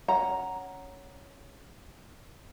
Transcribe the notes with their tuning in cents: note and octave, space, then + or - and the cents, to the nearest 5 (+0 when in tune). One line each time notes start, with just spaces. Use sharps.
C#4 +5 F#5 +0 A#5 +0